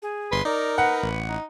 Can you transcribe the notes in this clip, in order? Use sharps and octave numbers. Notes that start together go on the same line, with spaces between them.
G#4
G1 B4 C6
D#4 A#4 D5
B4 F#5
A1
D#4